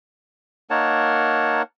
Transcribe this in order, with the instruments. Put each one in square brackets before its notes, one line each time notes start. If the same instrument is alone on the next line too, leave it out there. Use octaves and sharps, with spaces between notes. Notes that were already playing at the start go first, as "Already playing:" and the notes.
[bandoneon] A#3 A#4 F#5 [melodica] D#4 C#5 A5